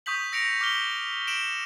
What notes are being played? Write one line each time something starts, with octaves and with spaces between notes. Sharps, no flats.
C#6 D#6 G6 B6 F#7
E6 A#6 C#7 D7 F7
D6 F6 G7
D7 E7 F#7